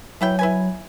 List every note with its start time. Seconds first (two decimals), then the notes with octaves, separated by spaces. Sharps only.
0.21 E3 F#3 E4 G5
0.39 E4 B4 G#5